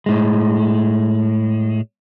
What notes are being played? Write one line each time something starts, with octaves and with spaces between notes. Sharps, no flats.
A2 G#3